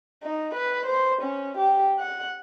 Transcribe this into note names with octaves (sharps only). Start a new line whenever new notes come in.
D#4
B4
C5
C#4
G4
F#5